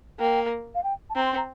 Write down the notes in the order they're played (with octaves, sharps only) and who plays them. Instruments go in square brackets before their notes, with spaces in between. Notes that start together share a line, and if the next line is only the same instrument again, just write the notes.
[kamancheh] A#3 [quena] G5
[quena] F5
G5
A5
[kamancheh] C4 [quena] A#5
[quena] C6
A#5